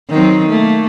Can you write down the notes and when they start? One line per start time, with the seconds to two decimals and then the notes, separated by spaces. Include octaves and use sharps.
0.10 D#3 F#3 C4
0.48 A3 A#3